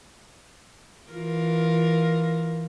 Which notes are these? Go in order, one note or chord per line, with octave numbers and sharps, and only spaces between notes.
E3 F4 A#4